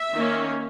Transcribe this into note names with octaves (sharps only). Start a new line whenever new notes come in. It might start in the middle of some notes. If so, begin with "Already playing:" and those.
Already playing: E5
D#3 A#3 C#4